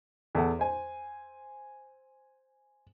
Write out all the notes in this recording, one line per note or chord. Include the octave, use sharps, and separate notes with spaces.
E2 A4 F#5
C5 G#5